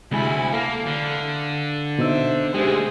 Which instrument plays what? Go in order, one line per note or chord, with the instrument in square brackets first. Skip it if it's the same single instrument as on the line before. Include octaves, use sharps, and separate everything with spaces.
[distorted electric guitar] D2 [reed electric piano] C3 G#3 G#5 [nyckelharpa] E4 B5
[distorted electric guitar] A#3 [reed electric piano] A4 [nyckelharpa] F5
[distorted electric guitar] D3
[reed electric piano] B2 D#4 E6 [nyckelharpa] C5 E5
[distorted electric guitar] D2 G#3 [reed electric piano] G4 [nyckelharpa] G#4 C5